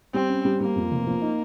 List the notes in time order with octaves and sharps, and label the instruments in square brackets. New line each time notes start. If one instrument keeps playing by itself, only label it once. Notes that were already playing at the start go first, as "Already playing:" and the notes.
[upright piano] G3 [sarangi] C4
[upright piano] C#4
G3
[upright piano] G3 [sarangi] A#3
[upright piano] F2
F1
F3
D#4